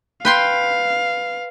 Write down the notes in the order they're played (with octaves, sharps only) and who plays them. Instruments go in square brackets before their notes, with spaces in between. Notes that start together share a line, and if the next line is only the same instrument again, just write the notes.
[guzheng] B4 G5 C6 [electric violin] F5